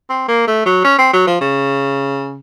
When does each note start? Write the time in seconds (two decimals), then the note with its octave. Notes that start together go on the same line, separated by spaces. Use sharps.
0.09 C4
0.28 A#3
0.47 A3
0.66 F#3
0.84 C#4
0.98 C4
1.13 F#3
1.27 F3
1.41 C#3